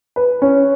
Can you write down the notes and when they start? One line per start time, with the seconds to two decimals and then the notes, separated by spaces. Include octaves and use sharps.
0.16 B4
0.42 C#4